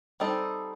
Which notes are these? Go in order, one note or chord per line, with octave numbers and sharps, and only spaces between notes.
G3 C4 D#4 A4